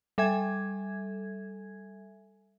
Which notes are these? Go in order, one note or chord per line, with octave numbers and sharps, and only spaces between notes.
G3 A4 E5 G#5 G#6